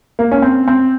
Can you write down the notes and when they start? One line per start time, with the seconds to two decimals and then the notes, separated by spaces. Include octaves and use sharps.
0.19 A#3
0.32 C#4
0.42 C4
0.68 C4